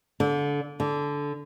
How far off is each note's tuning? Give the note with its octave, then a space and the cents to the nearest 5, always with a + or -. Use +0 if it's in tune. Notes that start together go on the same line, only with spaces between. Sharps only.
D3 -25
D3 -15